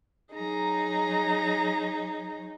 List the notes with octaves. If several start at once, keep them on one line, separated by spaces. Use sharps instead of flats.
F#3 D#4 G#4 A#5